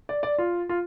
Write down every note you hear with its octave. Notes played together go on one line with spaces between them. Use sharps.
D5
D5
F4
F4